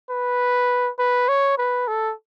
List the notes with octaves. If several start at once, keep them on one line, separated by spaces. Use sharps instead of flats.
B4
B4
C#5
B4
A4